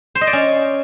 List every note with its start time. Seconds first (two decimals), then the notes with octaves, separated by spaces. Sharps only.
0.15 C5
0.21 D#5
0.27 D5
0.33 C#4